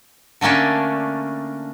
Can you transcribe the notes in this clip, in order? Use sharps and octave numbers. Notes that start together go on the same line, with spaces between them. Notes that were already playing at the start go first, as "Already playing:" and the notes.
D3 A3 A#3 C#4 D4